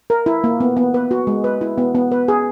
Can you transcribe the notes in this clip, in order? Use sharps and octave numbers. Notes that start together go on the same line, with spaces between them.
A#4
E4
A#3
B3
B3
B4
F#4
G#3
B4
E4
B3
B3
B4
G#4